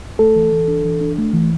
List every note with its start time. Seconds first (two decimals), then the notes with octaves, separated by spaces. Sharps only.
0.19 A3 A4
0.36 E3
0.52 E3
0.68 D4
0.85 E3
1.01 D4
1.18 A3
1.33 E3